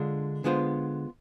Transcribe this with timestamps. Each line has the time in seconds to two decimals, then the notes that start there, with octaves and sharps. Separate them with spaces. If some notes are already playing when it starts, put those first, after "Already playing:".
Already playing: D3 G#3 D4 F4
0.44 D3 G#3 B3 F4 C5